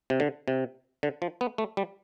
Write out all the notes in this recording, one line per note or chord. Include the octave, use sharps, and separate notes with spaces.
C3
D3
C3
D3
F3
B3
A3
G3